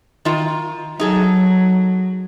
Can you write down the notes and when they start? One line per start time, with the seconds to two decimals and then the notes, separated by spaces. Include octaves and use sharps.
0.25 D#3 F4
1.00 F#3 D#4 G#4 A4